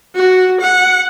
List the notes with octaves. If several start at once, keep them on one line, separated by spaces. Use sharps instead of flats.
F#4
F#5